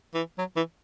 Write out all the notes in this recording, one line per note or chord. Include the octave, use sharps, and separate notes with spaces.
E3
F#3
E3